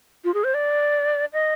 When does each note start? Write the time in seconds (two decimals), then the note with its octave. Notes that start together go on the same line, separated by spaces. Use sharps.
0.24 F4
0.34 G#4
0.44 C5
0.54 D5
1.33 D#5